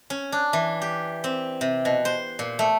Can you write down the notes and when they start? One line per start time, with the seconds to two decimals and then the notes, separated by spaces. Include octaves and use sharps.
0.10 C#4
0.32 D4
0.53 E3
0.82 G4
1.24 C4
1.61 C3
1.85 B2
2.05 C5
2.39 A#2
2.59 A3